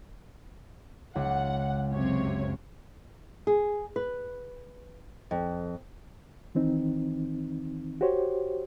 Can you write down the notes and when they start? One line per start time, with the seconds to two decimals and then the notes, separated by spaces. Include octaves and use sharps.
1.15 C#2 F#5
1.92 F#2 C3 C#5
3.47 G#4
3.96 B4
5.31 F2
6.55 D#3 E3 C4 D#4
8.01 F#4 G4 C5 C#5